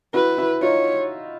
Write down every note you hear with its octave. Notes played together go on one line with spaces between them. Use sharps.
E4 F#4 B4
E4 F#4
D#4 F4 C#5